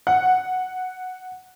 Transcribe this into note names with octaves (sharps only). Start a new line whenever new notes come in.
F#5